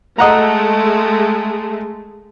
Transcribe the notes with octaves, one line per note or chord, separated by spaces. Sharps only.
G#3 A3 D#5 F#5 A#5